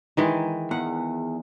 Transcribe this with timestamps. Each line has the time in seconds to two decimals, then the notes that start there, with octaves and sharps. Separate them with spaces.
0.17 D#3 E3 G#3
0.71 E2 F#5